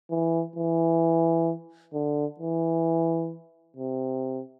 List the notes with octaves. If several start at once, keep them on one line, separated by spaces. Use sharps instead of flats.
E3
E3
D3
E3
C3